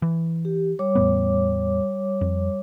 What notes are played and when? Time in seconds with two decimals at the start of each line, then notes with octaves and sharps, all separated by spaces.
0.02 E3
0.45 G4
0.79 G3 C#5 D6
0.95 E2 A2 B3
2.21 F2